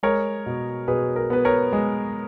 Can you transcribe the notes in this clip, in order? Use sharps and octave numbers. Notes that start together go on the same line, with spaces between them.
G#3 A#4 C#5
B2
B2 G#4 B4
A#4
B3 B4
A#4 C#5
G#3